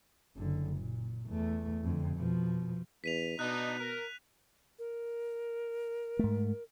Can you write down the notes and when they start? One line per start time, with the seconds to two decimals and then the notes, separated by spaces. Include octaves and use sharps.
0.36 F#1 D3
0.77 A#2
1.28 E2 A3
1.84 F2 D3
2.15 B2 F3
3.04 E2 B6 D#7 F7
3.39 B2 B3 D4 D#4 F#6
3.80 A#4
4.79 A#4
6.19 G#2 A3